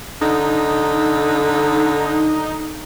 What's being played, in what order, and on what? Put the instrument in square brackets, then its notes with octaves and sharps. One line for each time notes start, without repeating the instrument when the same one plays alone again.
[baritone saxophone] D3 [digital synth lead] D#4